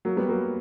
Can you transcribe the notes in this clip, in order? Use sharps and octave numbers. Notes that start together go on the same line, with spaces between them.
F#3 A#3
G3 B3
F#3 A#3